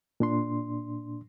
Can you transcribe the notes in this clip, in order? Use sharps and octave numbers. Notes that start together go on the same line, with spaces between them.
A#2 D4 C6